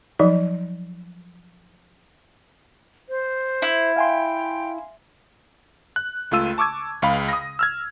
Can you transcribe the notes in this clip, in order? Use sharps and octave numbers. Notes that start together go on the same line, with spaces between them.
F3 F#3 D#4
C5
E4
F5 G5 G#5 C6
F#6
C#2 A3 F4 E6 D#7
A5 C#6 D6 E6 G#6
C#2 F5 B5
D#6 A#6
E6 F6 G#6